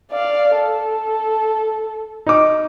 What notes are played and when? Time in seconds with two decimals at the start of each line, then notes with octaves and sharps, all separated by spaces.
0.11 D5 F5
0.55 A4
2.26 D#4 D6